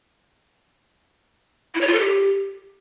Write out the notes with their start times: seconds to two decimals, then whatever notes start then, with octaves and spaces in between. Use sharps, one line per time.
1.75 E4
1.81 C#5
1.87 F4
1.94 A4
2.00 G4